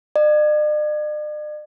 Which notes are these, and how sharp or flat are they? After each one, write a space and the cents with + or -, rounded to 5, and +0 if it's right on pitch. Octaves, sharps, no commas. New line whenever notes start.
D5 +45